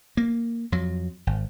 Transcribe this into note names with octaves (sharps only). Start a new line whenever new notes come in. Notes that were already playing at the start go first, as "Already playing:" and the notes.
A#3
F2 F#3
G#1